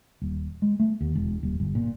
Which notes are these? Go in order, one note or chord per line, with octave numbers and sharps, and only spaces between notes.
D#1
G#3
A3
D#2
E1
D#1
G1
A#2